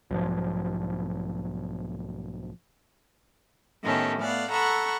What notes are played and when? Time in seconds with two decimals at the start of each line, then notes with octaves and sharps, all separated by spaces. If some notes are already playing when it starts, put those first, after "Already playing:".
0.11 B1 G#2 F3
3.83 A2 D#3 B3 C#4 G4 A4
4.20 A3 B3 D5 F5 F#5
4.51 A4 F#5 A#5 B5 C#6 E6